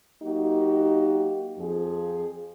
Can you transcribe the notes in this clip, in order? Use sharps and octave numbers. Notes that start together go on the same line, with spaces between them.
F#3 A#3 D#4 F#4 G4
F2 F3 G#4